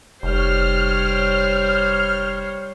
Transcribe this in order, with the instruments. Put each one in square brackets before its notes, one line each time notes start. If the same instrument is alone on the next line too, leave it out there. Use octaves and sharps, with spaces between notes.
[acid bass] F1 [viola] G3 C5 [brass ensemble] C#5 [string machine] F6